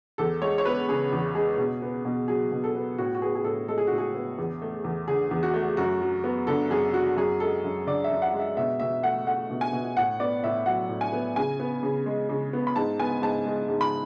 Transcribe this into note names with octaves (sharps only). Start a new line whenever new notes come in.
E2 A4
G#3 C#5
C#5
B3 B4
C#3 G#4
E2
G#3 G#4
B2
B3
B2
F#3 G#4
B2
A4
B3
A2 F#4
F#4
B3 G#4
G#4
A2 A4
G#3 A4
G#4
A2 F#4
G#4
B3
E2
A3
E2
D3 G#4
E2
F#4
A3
F#2 F#4
F#3
B3
D3 A4
F#2 G#4
F#3 F#4
F#2 G#4
G#3 A4
F#2
D3 D5
E5
F#2
F#5
G#3
E5
B2 E5
B2 E5
A3 F#5
A3 F#5
B2
G#5
B2
A2 F#5
B3 D5
A2 E5
F#3 F#5
A2
G#5
B3
C#3 G#5
B3
C#3
G#3
C#3
B3
B5
G#2 A5
B3 G#5
G#2 A5
G#3
G#2
B5